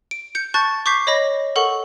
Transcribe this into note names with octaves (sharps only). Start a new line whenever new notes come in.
D7
G6 C#7
A5 C#6 F#6 G6 A6
C#6 D6 G6 B6 C7
C#5 D#5 B5 A#6
A4 A#4 F#5 C#6 F#7